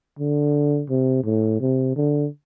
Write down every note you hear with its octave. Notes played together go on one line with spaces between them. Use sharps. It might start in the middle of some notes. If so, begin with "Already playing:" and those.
D3
C3
A2
C3
D3